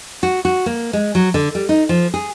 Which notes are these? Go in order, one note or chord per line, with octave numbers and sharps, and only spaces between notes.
F#4
F#4
A#3
G#3
F#3
D3
G3
D#4
F3
G#4